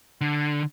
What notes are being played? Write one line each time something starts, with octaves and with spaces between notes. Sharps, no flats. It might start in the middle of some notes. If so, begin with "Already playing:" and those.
D3